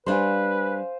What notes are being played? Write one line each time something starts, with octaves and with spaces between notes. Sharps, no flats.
G3 D4 B4 C5 F5 G#5